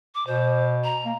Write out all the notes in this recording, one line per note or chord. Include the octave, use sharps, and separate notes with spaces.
D6
B2 C5
A#5
A#3